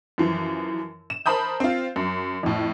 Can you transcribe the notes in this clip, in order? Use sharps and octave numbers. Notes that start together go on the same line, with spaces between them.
F#2 E3 F3
E7
A#4 C5 A5 B5 D#6 G6
C4 F4
F#2
F2 A2